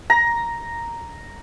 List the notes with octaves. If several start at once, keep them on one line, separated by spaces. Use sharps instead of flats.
A#5